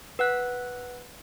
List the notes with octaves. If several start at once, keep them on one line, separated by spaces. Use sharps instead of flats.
B4 F#5 F#6